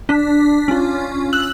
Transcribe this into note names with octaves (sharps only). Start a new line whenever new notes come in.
D4 B6
C#4 F4
E6 F#6 F#7